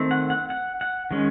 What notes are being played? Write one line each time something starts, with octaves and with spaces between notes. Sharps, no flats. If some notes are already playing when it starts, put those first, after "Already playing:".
Already playing: D#3 A3 C4
F#5
F#5
F#5
F#5
D#3 G#3 C#4